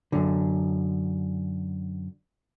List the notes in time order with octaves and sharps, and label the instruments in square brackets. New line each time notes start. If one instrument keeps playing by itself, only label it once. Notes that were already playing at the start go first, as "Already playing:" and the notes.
[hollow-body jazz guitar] F#2 D3